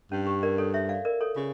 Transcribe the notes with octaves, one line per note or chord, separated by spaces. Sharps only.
G2 C#4
G4
A#4 D5
A4 C#5
C#5 E5
D5 F5
A#4 D5
A4 C#5
C#3 F4